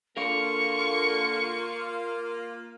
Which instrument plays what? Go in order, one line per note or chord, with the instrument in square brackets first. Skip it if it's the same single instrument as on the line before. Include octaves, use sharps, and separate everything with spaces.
[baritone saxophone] D3 [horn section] A#3 F4 [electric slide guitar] A#4 F5 [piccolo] C#6